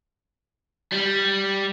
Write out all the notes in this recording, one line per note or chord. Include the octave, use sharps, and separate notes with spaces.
G3